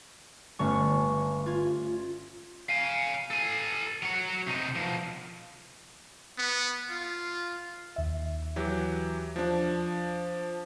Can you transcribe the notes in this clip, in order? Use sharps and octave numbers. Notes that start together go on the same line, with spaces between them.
G1 G2 A3 C#4 C#6
F4 G#6
F5 G#5
A4 G#5
F#3 C#5
C3 D#4
B2 F3
B3
F4
D#2 E5
E3 F#3 G4
F3 D4